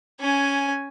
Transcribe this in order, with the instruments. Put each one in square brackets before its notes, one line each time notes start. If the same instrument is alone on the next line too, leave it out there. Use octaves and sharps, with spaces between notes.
[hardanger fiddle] C#4 G#5